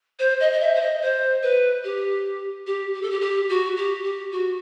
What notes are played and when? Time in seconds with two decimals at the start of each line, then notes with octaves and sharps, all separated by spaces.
0.19 C5
0.40 D#5
0.52 D#5
0.60 E5
0.75 C5
0.81 D#5
1.02 C5
1.42 B4
1.84 G4
2.66 G4
2.94 G4
3.02 A4
3.10 G4
3.21 G4
3.49 F#4
3.77 G4
4.03 G4
4.31 F#4